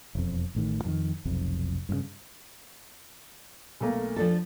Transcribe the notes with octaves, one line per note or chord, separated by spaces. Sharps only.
E1 F2
A1 A2 D#3
F2 D3 D#3
F1 B1 F2
G2 A#2 C#3
B1 A3 A#3
F3 D4 A4